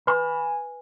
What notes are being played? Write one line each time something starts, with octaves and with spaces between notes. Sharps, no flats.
B4 G#5 B5